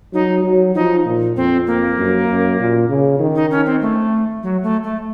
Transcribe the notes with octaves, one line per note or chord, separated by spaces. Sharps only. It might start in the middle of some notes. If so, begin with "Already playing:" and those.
F#3 D#4
F#3
F3 D#4
A#2
F2 C4
A#3
F#2
F#2
A#2
C#3
D#3
D#4
C#4
C4
A3
F#3
A3
A3